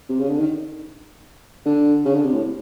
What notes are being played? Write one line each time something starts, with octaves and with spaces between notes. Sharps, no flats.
C3
C#3
D3
D#3
D3
C#3
D3
C3
A2